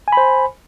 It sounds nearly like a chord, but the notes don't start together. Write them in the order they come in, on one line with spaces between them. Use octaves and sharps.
G#5 B5 C5